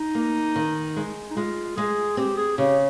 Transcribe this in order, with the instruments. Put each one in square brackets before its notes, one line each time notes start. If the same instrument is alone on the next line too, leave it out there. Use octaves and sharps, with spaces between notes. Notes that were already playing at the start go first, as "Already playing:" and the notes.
Already playing: [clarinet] D#4
[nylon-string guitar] A#3
D#3
G#3
[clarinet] D#4
[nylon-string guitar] G#3 [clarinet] F4
[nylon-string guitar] G#3 [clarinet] G#4
[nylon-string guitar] C4 [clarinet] G4
[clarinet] G#4
[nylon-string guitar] C#3 [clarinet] G4